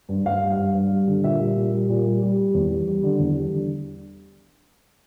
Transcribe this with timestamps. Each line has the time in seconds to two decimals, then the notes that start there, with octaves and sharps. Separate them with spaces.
0.09 G2
0.25 G2 F5
0.42 G3
0.52 F5
0.58 G2
0.74 G2
0.91 G3
1.07 D3
1.23 A#2 E5
1.39 G3
1.56 A#2
1.73 G3
1.89 A#2
2.06 G3
2.22 G3
2.38 G3
2.54 E2
2.71 G3
2.87 G3
3.03 D3
3.20 E2
3.36 G3
3.52 D3